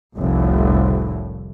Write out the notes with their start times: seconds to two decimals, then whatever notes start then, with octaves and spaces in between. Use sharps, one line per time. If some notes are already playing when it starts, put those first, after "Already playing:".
0.18 F1 C2 A2